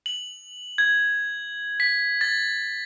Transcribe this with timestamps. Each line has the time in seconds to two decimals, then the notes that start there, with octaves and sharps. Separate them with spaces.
0.06 F#7
0.78 G#6
1.80 B6
2.21 A6